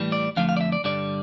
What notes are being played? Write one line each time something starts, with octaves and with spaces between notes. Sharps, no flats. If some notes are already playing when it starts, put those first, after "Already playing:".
Already playing: A2 E3 G3
D5
F2 D3 F3 A3 F5
F5
D5
E5
D5
G2 D3 G3 D5